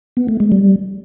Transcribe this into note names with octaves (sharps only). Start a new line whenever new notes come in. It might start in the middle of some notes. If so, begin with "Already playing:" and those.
B3
A3
G#3
G3